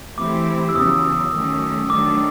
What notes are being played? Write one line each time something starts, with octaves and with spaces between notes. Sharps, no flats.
E3 A3 C4 E4 G4 D6
E6
E2 C#3 F#3 D#6
D#3 F#3 A3 C#4
D#3 F#3 A3 D4 D6